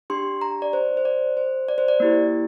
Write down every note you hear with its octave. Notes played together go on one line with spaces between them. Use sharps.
D4 G4 C6
A#5
D5
C5
C5
D5
C5
D5
C5
D5
A#3 E4 G4